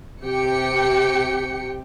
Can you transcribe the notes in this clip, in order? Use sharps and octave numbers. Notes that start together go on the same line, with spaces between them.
C3 G4 G5 C#7